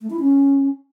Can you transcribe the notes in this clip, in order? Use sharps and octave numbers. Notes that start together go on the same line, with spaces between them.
A3
E4
C#4